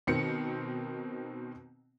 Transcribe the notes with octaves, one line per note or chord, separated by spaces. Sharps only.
B2 D#3 C4 C#7